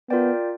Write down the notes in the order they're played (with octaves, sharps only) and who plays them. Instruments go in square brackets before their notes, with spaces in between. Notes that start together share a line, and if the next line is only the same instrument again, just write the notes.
[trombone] B3 [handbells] F4 A#4 D5 G5